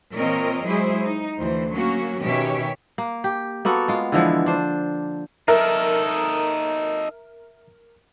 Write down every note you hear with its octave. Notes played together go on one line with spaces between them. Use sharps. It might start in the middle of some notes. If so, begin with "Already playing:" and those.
A#2 E3 C4 A#4 C#5 D#5
F#3 G#3 E4 G#4 C5
D#4
D2 E3 C5
F#3 A#3 C#4 F#4
B2 D#3 C#4 G4 C#5 E5
A#3
G4
A#3 B3 F#4 A4
G#3 F4
D3 E3 F3 G#3
D4 C5
D#4 A4 A#4 E5